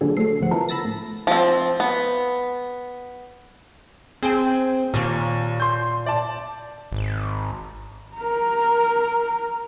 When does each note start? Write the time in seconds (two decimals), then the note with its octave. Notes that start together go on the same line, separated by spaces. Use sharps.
0.01 A#2 D3 F#3 D4 G#4 A4
0.17 F#3 A3 A4 C7
0.40 G#1 C#2 D3 F3 F#5
0.51 F3 B3 E4 A4 A#4
0.69 B5 E6 A6 A#6
0.85 A2
1.27 F3 C4
1.80 B3
4.23 C4 G#4 G5
4.94 D#2 A#2
5.60 C6 G6
6.06 D5 A5
6.92 G#1
8.16 A#4 A#5